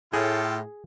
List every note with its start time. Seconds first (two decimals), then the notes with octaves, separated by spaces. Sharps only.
0.13 A2 F4 G#4 A4 G5